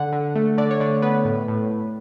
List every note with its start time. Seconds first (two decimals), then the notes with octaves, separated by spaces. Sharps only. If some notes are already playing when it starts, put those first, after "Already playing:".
Already playing: D3 F#5
0.12 D3
0.35 A3
0.58 D3 D5
0.71 C#5
0.80 D3 D5
1.02 B3 B4
1.25 A2
1.48 A2
1.71 A2